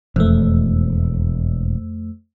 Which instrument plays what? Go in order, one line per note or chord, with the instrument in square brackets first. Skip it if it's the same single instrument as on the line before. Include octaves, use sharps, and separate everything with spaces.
[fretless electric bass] E1 [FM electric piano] F2 A3